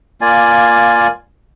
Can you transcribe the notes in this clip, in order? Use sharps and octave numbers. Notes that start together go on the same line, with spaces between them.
A#3 F4 D5 G#5